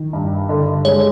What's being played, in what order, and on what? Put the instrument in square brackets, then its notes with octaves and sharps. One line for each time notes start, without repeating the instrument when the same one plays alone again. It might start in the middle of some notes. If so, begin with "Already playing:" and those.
Already playing: [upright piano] D#3
G2
D3
[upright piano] G#3 [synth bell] C#5